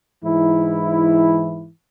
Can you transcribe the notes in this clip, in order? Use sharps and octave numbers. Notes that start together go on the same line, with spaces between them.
G#2 E3 E4